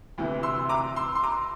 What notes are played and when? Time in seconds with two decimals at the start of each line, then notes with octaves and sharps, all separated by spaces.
0.18 D2 C3 E3
0.43 C6 E6
0.69 A#5 D6
0.96 C6 E6
1.15 C6
1.23 A#5 D6